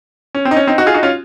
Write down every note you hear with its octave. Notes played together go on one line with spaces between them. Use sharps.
C#4
C4
D#4
C#4
C4 D#4
D#4 F#4
F4 G#4
D#4 F#4
C#4 F4